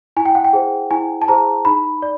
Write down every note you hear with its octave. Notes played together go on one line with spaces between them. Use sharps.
E4 G#5
G5
F#5
G5
G#4 C5
E4 G#5
A5
G#4 C5 A#5
D#4 B5
D5